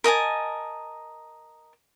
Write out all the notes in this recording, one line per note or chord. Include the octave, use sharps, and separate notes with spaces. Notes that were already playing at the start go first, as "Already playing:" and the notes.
A#4 D#5 G#5 A5